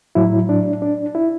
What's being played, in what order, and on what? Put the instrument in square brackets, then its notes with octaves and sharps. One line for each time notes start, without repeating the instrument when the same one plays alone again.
[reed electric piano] A2 F#3 E4
D4
D4
E4